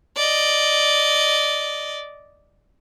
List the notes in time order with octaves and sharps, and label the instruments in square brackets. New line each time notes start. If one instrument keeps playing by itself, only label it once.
[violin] D5 D#5